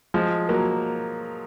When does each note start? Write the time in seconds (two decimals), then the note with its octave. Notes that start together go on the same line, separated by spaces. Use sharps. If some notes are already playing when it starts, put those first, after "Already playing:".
0.14 F3 G#3
0.49 F#3 A#3